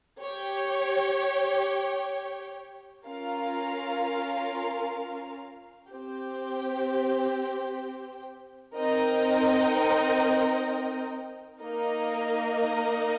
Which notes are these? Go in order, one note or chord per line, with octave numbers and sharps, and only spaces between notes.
G4 C#5 G5
C#4 F4 A#4 F5
C4 G4 C5 G5
C4 D#4 A#4 D#5 G5
A#3 D#4 A#4 D#5